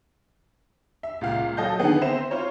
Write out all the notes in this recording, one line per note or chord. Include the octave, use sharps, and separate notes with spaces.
E5
C#2 A#2 F5
F#3 A4 D#5 A5 G6
D3 D#3 B3 G#4
C4 C5 E5 E7
F4 C5 C#5